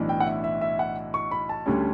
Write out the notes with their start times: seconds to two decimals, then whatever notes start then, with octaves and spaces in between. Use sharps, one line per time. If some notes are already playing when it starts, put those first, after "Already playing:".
Already playing: B1 A2 E3 B3 D4
0.09 G5
0.20 F#5
0.26 E5
0.44 E5
0.61 E5
0.79 F#5
1.14 C#6
1.31 B5
1.49 A5
1.66 D2 D3 G3 C#4